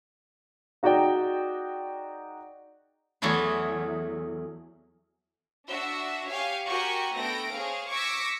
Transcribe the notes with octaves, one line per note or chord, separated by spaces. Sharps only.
D#4 F#4 G#4 D5 G5 A#5
E2 F#3 A3 G#4 B4
D4 F#4 E5
G4 C#5 F5 G#5
F#4 G4 A#4 G5 G#5 C#6
A3 B3 D4 G5 A#6 D7
G#4 C5 C#5 F5
C#6 D6 E6 G#6 A#6 B6